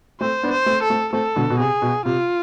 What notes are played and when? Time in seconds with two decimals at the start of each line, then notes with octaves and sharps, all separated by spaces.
0.20 A3 C4 C5
0.43 B3 D4
0.51 C5
0.66 A3 C4
0.83 A4
0.90 A3 C4
1.13 A3 C4 A4
1.36 B2 D3
1.50 B2
1.59 C3 G#4
1.82 B2
2.05 C3 F4